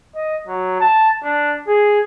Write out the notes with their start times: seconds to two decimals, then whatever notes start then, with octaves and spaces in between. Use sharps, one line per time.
0.15 D#5
0.47 F#3
0.80 A5
1.23 D4
1.68 G#4